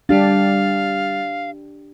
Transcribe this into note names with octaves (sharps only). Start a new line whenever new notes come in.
G3 D4 G4 F5 A6